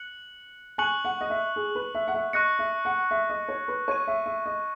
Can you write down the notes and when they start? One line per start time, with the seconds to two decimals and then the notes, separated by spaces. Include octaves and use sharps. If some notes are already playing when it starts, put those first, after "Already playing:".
Already playing: F#6 C#7 F#7
0.78 G#5 C#6 F#6 C#7 F#7
1.05 F#5
1.21 D#5
1.30 E5
1.56 G#4
1.75 B4
1.95 E5
2.08 F#5
2.15 E5
2.33 D#5 C#6 F#6 A#6 C#7
2.59 E5
2.85 F#5
3.11 E5
3.30 D#5
3.49 C#5
3.68 B4
3.88 C#5 C#6 G#6 D#7
4.07 E5
4.26 E5
4.46 D#5